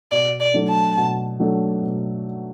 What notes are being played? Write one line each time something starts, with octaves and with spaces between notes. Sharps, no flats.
B2 D5
D5
F#3 A3 D4 A4
A5
B2
F#3 A3 D4 A4
B2